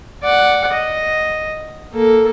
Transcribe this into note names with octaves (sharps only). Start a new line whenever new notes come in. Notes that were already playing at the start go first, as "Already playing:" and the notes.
D5 F#5
D#5
A#3 A4